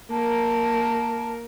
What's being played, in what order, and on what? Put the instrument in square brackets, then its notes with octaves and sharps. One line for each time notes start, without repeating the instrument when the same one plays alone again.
[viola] A#3 A#4 [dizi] A5